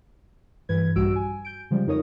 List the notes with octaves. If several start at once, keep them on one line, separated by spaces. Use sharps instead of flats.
G2 E3 B4 G#6
A#1 G2 G3 F#4 E6 D7
G#5
G6 D7
C#3 F3 G3 G#3
F2 D#4 F4 A#4 C#5 D#6